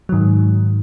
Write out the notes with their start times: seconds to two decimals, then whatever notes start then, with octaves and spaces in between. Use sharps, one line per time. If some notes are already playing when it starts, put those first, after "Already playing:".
0.09 G#2 D#3 F#3